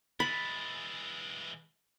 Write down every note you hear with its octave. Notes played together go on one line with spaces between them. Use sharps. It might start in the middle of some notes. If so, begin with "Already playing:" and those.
E3 G#3 B5 A6